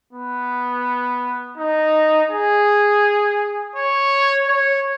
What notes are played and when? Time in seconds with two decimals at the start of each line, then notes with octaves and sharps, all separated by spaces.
0.13 B3
1.58 D#4
2.31 G#4
3.76 C#5
4.48 C#5